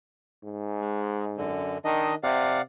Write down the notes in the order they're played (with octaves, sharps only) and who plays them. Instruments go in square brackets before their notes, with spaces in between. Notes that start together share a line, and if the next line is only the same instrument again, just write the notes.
[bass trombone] G#2
[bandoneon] G#3
F#2 D3
[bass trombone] D#3 [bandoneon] D4 D#5
[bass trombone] C3 [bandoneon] D5 F5 F#5